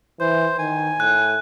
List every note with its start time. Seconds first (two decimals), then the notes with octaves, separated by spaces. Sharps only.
0.20 E3 C5
0.59 D#3 G#5
1.00 A2 F#6